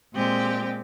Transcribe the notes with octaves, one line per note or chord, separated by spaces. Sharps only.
A#2 G#3 C4 G4